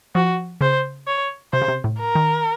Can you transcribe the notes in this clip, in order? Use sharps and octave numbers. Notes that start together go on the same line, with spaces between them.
F3 F#4
C#3 C5
C#5
C3 C5
C#3
C3
A2
A#4
D#3